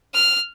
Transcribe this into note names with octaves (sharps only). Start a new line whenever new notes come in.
F6